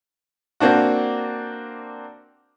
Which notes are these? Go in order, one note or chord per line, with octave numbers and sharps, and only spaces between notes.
A#3 C4 D4 F#4